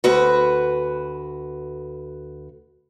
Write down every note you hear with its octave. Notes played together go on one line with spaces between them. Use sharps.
D2 F#4 B4